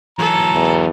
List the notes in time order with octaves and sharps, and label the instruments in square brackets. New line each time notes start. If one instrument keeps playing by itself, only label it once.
[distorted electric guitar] E3 F#3 [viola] A4 [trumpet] A#5
[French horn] E2